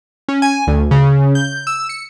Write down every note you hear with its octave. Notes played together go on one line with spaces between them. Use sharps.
C#4
G#5
D2
C#3
G6
E6
C#7